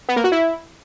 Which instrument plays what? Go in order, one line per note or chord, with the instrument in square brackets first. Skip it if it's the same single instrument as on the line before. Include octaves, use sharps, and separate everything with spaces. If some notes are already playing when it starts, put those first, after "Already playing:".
[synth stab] B3
A#3
F#4
E4